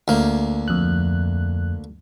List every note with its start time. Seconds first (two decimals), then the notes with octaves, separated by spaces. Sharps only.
0.08 D2 A#3
0.68 F2 F#6